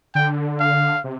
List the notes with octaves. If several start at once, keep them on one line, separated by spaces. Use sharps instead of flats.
D3 G5
F5
C3